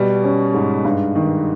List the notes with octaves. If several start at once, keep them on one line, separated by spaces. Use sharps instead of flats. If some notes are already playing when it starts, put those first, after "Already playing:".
Already playing: B2 G3
C#4
G#2
G2
D#3